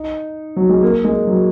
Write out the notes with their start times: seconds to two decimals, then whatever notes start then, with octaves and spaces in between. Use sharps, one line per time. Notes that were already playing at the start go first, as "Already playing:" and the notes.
Already playing: D#4
0.56 F#3
0.69 G#3
0.83 A#3
1.05 G#3
1.27 F#3